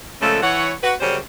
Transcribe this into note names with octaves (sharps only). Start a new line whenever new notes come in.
A#2 C#3 F3 G#3 A3 A4
E3 C#5 F#5
F#4 B4
F#2 C#3 G3 C#4 C5